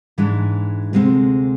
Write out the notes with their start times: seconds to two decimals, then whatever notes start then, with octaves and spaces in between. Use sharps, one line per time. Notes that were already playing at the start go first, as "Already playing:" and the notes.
0.18 G#2 E3 G#3 D4
0.93 D2 C3 G#3 C4